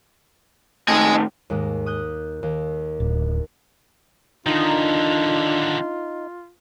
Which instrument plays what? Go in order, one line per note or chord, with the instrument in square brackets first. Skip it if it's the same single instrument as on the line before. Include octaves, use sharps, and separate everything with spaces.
[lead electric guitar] A2 D#3 [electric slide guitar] D#5 G#5
[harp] D#2 G#2 G#3
D#6 F#6 G6
D#2
[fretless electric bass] D1
[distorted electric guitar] D3 D#3 [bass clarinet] D4 [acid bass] D#4 [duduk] F4